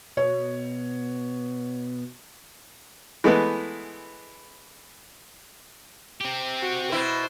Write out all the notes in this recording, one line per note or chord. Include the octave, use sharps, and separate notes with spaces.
B2 C#5
E3 G#3 A3 B3
C4 G4
F#4
B2 E4 C5